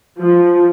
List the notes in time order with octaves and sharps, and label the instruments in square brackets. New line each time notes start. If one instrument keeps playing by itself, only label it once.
[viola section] F3